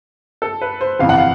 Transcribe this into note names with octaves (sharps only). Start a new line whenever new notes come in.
A4
B4
C5
G1 F2 C3 E3 F5
F#5
F5